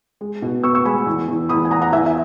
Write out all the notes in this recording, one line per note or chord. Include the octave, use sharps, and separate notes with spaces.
G#3
B2
B3 C#6 E6
C#6 E6
G#3 G#5 B5
E2
E2
E2 B5 D#6
G#5
E2 F#5 A#5
F#5 A#5
E2 E5 G#5
E5